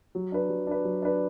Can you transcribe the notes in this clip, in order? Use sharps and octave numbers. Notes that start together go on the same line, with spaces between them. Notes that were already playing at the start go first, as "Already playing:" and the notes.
F#3
D4 B4
F#3
D4 B4
F#3
D4 B4